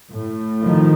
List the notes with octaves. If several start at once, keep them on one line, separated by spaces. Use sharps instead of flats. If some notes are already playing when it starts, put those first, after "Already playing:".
A2
D#3 F3